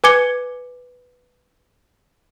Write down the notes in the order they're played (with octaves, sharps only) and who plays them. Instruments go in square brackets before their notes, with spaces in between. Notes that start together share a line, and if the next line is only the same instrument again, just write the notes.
[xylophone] B4 G#5 D6 G#6 C#7 G7